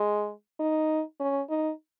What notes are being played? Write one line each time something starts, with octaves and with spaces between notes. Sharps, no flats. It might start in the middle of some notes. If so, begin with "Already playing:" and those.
Already playing: G#3
D#4
C#4
D#4